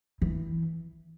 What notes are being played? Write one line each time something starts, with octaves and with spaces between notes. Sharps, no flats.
E3